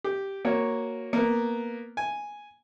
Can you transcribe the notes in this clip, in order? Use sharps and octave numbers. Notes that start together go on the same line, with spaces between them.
G4
A#3 F#4 C#5
A#3 B3
G#5